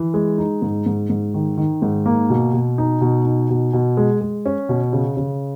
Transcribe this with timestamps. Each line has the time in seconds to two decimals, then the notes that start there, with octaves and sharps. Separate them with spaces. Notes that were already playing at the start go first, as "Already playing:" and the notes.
Already playing: E3
0.14 G#3
0.38 D#4
0.62 G#2
0.86 G#2
1.10 G#2
1.34 D#3
1.58 D#3
1.82 G#2
2.06 A#3
2.30 B2
2.53 B2
2.78 D#4
3.01 B2
3.25 D#4
3.50 B2
3.73 B2
3.97 G#3
4.21 G#3
4.46 C#4
4.69 B2
4.93 C#3
5.17 C#3